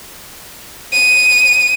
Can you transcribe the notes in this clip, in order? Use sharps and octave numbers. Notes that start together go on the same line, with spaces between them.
D#7